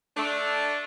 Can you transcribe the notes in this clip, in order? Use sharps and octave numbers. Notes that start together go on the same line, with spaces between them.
A3 D4